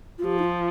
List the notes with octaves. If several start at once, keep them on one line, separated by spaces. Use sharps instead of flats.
F4
F3 G4
D#4
F4